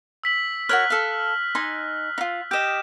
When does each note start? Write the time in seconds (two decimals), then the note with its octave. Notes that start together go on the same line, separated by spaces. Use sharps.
0.24 E6 B6 F#7
0.69 F#4 A#4 C#5 F6 F#6 F#7
0.90 A4 F5
1.55 D#4 G#5 C6
2.18 D#4 F4
2.51 G4 D#5 G6 E7